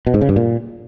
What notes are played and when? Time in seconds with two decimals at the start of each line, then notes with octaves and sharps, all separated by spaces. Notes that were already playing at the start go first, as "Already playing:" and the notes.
0.07 B2
0.14 G#2
0.21 C#3
0.29 G2
0.36 A#2